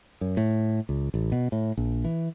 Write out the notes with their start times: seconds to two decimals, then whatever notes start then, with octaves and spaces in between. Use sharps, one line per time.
0.21 F#2
0.37 A2
0.89 C#2
1.14 A1
1.32 B2
1.52 A2
1.77 A#1
2.05 E3